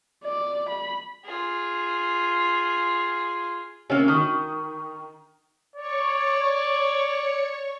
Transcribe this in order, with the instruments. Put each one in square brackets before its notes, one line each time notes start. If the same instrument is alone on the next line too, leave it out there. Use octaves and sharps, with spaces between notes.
[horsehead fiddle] D5
B5
[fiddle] F4 G#4
[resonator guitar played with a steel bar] C3 A#3 [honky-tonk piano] C#4
[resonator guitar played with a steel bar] D#3 [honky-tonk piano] C#6 D#6
[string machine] C#5 C#6 [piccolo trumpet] D5